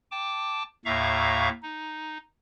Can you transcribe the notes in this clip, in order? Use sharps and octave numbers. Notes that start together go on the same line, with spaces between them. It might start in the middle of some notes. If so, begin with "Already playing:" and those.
G5 A5 D6
D#2 A2 E5 F5 A#5 C#6
D#4